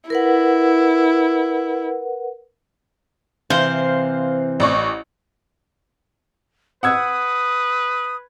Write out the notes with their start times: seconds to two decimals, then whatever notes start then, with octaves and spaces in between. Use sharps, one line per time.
0.10 E4 A#4 B4 F#5
3.50 C3 E3 C5 F5
4.60 A1 D5 C#6
6.83 B4 F#5 D#6 E6 G#6